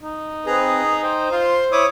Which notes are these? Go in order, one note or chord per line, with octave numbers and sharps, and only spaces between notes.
D#4
C4 G#4 B4 A#5
C5 G5
F4 C6
E4 C#5 D6 D#6